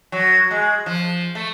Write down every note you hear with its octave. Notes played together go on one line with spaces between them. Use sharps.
F#3
G#3
F3
A3